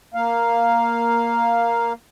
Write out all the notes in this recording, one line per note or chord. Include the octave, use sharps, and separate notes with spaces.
A#3 F5